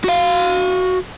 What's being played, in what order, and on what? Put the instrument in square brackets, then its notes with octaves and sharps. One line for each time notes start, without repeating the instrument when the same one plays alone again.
[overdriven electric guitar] F#4 F5